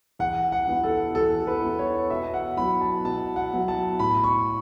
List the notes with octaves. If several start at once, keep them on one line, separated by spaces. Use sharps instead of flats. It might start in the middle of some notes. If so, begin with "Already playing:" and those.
E2 F#5
F#5
E3 B3 E4
A4
E2 A4
B4
E3 B3 E4
C#5
B2 E5
F#5
F#3 B3 E4 B5
A5
B2 A5
F#5
F#3 B3 E4
A5
A2 B5
C#6